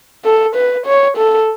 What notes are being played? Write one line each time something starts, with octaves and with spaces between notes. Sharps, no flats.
A4
B4
C#5
A4